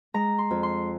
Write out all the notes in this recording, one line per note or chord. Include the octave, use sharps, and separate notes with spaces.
G#3 A#5
C6
F2
C6